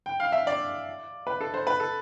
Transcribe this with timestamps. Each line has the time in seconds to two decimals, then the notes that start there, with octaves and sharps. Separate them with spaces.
0.06 G5
0.20 F5
0.32 E5
0.47 D5
1.27 B4
1.41 A4
1.54 C5
1.67 B4
1.80 A4